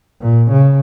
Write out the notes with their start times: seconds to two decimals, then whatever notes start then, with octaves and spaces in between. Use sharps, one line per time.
0.21 A#2
0.51 C#3